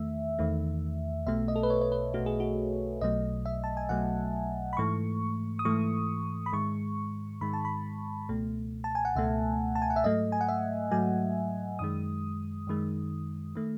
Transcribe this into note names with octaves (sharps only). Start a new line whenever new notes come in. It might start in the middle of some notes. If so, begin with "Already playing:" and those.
Already playing: E2 D#3 A3 E5
E2 D#3 A3
B1 B2 A3 E5
D#5
A4
B4
C#5
C#5
B4
B1 B2 A3 F#4
G#4
F#4
B1 B2 F#3 A3 D#5
E5
A5
G#5
B1 B2 F#3 A3 F#5
B5
G#2 E3 A3 C#6
D#6
G#2 E3 A3 C#6
B5
G#2 D#3 G#3 C#6
G#2 D#3 G#3 B5
A5
B5
C#2 B2 A3
A5
G#5
F#5
C#2 B2 A3 E5
A5
G#5
F#5
E5
G#2 F#3 A3 D#5
G#5
F#5
E5
G#2 F#3 A3 G#5
F#2 D#3 G#3 D#6
F#2 D#3 G#3
D#3 A3